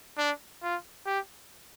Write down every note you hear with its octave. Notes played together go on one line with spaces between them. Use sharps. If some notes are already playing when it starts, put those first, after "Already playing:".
D4
F4
G4